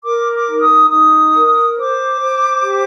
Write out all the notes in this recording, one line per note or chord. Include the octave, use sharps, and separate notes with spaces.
A#4 D6
D6
D#4
D#6
D#4 D#6
A#4
C5 D6
C5
G4